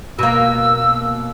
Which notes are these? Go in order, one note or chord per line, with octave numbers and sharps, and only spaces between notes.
B2 A#3 E6